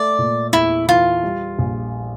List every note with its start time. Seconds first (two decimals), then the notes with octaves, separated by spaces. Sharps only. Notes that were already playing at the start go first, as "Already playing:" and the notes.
Already playing: A3 D5
0.18 A#2
0.53 E2 E4
0.88 E3 F4
1.23 G3
1.59 A#1